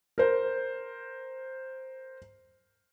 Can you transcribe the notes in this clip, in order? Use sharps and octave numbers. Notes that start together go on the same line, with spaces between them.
A#4 C5